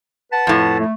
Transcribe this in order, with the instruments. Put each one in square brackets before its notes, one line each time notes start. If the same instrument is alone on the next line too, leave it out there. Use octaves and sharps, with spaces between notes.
[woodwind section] B4 F#5 A5
[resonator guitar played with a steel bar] F2 A2
[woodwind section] A3